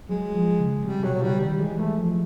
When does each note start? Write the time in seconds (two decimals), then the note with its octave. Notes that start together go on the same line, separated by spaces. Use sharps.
0.09 F#3 G#3
0.35 F3
0.59 C#3
0.84 C3 G3
1.03 B2 F#3
1.22 C#3 G3
1.41 D#3 G3
1.60 E3 G#3
1.79 A3
1.98 F3